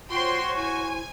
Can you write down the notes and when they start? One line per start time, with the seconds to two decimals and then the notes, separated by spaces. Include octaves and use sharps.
0.10 F4 F#4 C5 C#5 G5 C6
0.56 E4 G#5